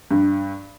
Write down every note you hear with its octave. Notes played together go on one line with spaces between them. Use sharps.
G2